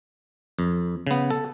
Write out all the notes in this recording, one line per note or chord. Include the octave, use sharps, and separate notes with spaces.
F2
C#3 B3
A4